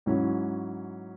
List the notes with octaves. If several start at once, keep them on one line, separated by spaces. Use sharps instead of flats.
G#2 F#3 C#4 E4